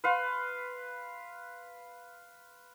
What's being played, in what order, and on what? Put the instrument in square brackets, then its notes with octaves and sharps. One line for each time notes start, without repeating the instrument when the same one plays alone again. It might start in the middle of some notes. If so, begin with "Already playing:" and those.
[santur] B4 F5 C6